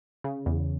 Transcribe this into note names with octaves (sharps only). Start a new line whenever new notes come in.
C#3
E2